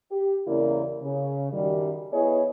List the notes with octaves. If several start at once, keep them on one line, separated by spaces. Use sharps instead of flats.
G4
E2 C#3 A#3 E4 A#4 D5
C#3
F#2 D#3 G3
B3 E4 G#4 B4 C#5 D#5